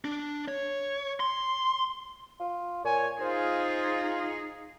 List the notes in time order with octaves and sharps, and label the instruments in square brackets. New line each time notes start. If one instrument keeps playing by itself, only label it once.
[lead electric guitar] D4
C#5
C6
[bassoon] F4
[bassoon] A#2 [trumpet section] C#5 G#5
[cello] D#4 G#4 [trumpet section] F4 [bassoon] C5